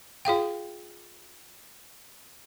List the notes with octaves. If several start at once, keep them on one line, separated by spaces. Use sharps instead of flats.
F4 G#4 F5 G5